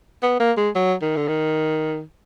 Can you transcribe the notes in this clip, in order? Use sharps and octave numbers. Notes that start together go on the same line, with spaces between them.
B3
A#3
G#3
F#3
D#3
D3
D#3